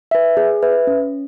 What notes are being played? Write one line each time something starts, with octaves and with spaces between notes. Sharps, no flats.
B4 E5
G#4
B4 E5
C#4